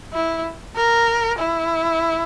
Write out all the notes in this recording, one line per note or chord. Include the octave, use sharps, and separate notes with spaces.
E4
A#4
E4